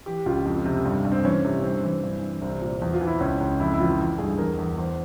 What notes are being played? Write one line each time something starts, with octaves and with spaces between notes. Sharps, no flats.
E3 G4
C#2 F4
F2
C3
G2
G2
C4
E3 C#4
C3
G2 C4
E3
G2
E3
C2 C4
A#2
E2
F4
E3
E4
C#2 C#4
C#2
F2 E4
E4
E3 F4
E3
G2 G#4
E2 A#4
E2
E2 C5